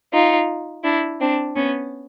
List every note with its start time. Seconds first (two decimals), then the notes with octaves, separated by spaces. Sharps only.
0.13 D#4 F4
0.84 D4 E4
1.20 C4 D4
1.55 B3 C#4